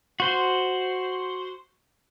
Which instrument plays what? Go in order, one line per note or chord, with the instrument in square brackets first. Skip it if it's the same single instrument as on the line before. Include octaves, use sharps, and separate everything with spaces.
[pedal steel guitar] F#4 C5